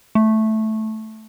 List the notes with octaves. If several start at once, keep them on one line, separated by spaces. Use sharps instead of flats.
A3